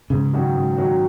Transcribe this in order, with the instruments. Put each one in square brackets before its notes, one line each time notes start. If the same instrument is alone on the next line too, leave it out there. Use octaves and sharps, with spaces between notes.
[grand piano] G#2 [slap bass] C#3
[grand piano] D#3 F#3 C#4 F#4
G#2
D#3 F#3 C#4 F#4